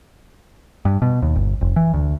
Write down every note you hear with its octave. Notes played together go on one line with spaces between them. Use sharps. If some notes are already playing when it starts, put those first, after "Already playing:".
G2
B2
D#2
G1
F1
E3
D2